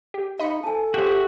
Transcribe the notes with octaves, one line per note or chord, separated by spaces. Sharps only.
G4
D#4 D#5 F5 B5 C#7
A4 G#5 A5
F#4 G4 C5 E5
G4